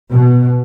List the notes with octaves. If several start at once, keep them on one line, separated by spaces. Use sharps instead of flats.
B2